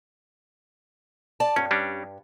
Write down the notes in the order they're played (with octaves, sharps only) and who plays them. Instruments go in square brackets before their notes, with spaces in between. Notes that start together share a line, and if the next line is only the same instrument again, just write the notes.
[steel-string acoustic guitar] D5 A5
[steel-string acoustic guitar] G2 [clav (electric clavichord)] C#4
[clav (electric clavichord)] G3 C#4 D4